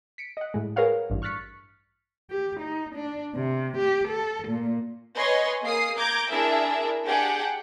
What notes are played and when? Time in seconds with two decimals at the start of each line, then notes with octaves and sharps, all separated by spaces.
0.18 B6 C#7 D7
0.37 D#5 F#5
0.54 A2 G#3
0.76 G#4 A#4 B4 C#5 F5 F#5
1.10 A1 G2
1.22 C#6 F6 F#6 A6 B6 C#7
2.31 G4
2.61 D#4
2.95 D4
3.35 C3
3.78 G4
4.08 A4
4.48 A#2
5.16 B4 C#5 D#5 G#5 C6
5.63 A#3 G#4 D#6 C7
5.97 A#5 D6 G6 G#6
6.30 D4 E4 G#4 A#4 E5
7.07 D4 G4 G#4 F#5 G5